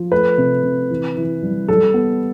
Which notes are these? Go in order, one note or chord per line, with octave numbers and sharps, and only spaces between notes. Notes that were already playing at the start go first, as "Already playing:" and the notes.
Already playing: F3
A3 B4
C3
C3
E3
E3
G3
G3 A4
B3